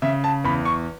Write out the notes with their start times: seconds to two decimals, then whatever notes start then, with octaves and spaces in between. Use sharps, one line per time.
0.02 C#3 E5
0.24 A5
0.44 E2 B5
0.65 C#6